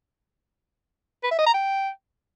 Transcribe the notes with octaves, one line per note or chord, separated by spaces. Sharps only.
B4
E5
D#5
A#5
G5